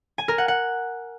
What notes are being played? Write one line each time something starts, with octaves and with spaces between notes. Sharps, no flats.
G#5
A#4
F#5
F#5